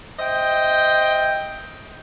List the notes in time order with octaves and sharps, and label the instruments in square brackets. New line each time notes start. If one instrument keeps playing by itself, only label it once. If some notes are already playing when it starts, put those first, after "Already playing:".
[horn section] C5 D#5 E5 G5